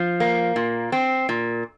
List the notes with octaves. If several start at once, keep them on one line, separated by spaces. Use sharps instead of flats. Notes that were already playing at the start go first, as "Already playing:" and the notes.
Already playing: F3
A#3
A#2
C4
A#2